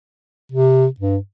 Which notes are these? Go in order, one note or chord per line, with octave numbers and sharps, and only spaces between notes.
C3
G2